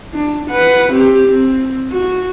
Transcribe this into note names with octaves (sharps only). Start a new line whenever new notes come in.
D4
B4 F#5
C4 G4
C4
F#4